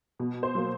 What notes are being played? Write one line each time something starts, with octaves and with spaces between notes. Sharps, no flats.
B2
C5
F#3 A#3